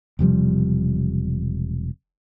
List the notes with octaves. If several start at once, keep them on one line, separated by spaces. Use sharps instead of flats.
E1 C3 F3 G3